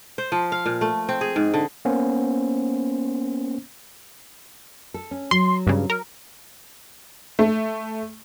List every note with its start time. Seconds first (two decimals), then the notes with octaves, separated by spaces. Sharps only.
0.18 C5
0.32 F3
0.52 F5
0.66 A#2
0.81 A3
1.09 C4
1.21 G#4
1.36 G#2
1.54 D3
1.85 A#3 B3 C#4 C5
4.94 A4
5.11 C#4
5.31 F#3 C6
5.67 G2 C#3
5.90 A#4
7.39 A3